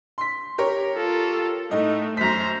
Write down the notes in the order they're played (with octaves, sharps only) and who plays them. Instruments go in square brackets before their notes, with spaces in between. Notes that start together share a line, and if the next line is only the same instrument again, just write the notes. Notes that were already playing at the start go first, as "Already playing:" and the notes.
[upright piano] C6 B6
G4 A#4 C#5
[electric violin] F4 A4
[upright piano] A2 D#5 [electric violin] A3 D#4
[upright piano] F#2 B6 [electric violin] C5 A#5